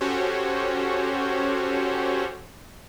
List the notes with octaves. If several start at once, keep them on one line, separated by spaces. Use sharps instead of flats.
C#4 F#4 G4 A4 C5 C#5